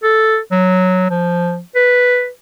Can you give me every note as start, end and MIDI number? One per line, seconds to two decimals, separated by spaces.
0.03 0.38 69
0.52 1.06 54
1.10 1.59 53
1.75 2.28 71